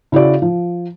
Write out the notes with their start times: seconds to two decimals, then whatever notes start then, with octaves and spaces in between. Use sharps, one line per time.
0.12 C#3 E4 F#4 D5
0.42 F3